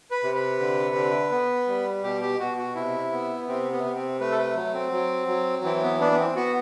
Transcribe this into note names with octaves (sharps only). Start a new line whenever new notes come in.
B4
C3
B4
D3
D3
B3
G3
B2 G4
G4
B2 F#4
F#4
C3 E4
B3
C3 C4
B3
C3
C4
A3 B4
A4
B4
F#3
C4
F#3
F#3
E3 C4
C4
B3
B3 D4
B3
C4
B3 F#4